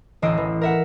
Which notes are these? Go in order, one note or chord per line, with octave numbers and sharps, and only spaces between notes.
A1 D2 D#5 E6 C7 D7
E3
A#4 E5 F#5